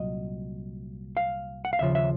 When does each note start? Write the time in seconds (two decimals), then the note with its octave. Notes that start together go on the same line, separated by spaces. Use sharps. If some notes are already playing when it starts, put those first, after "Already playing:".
Already playing: C2 A#2 F#3 D#5
1.17 F5
1.65 F#5
1.73 F5
1.79 D#2 C#3 F3 E5
1.95 E5